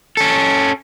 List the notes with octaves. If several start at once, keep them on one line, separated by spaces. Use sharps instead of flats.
C#4 A4